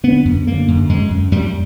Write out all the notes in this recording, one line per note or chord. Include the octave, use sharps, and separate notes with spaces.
D3 B3
F#2
D3 A#3
F#2
F#2 G#3
F#2
F#2 G3